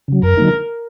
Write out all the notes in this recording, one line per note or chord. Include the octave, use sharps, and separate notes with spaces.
C#3 F#3
F#2 A#4
D3 F#3 A#3 D#4